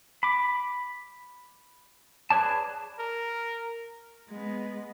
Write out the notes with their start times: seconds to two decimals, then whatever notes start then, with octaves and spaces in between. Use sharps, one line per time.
0.23 B5 D6
2.30 G#4 B4 C#5 D5 A5
2.99 A#4
4.28 G#3 B3